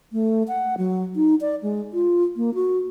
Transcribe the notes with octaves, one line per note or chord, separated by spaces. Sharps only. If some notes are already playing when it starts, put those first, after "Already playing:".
A3
F#5
F#3
D#4
D5
G#3
F4
A#3
F#4